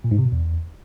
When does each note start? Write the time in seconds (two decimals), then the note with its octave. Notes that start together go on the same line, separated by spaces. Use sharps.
0.04 A#2
0.11 G#2
0.18 C3
0.25 B2
0.32 E2